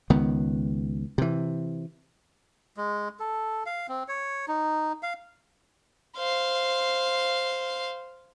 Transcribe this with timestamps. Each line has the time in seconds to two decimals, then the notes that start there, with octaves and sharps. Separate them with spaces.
0.10 C#2 D#3 B3
1.18 C3 E3
2.77 G#3
3.20 A4
3.66 F5
3.89 C4
4.08 C#5
4.48 D#4
5.03 F5
6.17 C5 F5